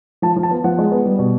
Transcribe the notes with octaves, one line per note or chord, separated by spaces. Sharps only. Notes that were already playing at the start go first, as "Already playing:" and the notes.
F3 A5
F3
A5
B3
F3 F#5
G#3
B3
G3
B2